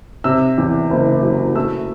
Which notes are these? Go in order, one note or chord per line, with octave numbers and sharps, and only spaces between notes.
C3 E6
E2
F#1
F#3
A3 E6